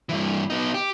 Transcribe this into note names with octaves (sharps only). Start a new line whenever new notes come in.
G2 E3
B3 D#4
G4